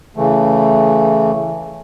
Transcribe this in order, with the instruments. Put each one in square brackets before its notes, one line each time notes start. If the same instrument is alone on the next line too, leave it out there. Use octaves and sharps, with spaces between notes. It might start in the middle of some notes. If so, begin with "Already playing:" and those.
[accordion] C#3 E3 A3